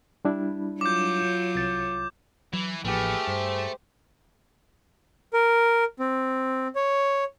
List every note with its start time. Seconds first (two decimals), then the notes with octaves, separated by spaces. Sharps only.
0.25 G3 D4 E4
0.81 F#3 F4 C#5 D6 G6
1.55 C2 A6
2.53 E3 F#3
2.85 A1 F3 A3 A#3 G4 G#4 B4 F6
3.27 G2 C5
5.33 A#4
5.99 C4
6.76 C#5